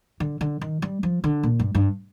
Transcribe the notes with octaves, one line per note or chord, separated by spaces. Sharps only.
D3
D3
D#3
G3
F3
D3
A#2
G2
G2